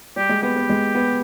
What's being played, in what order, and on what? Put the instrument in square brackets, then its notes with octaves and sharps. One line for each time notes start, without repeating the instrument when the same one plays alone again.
[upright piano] G3 [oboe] G4
[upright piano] G#3
[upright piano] B3 [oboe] G4
[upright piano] B3
G#3
B3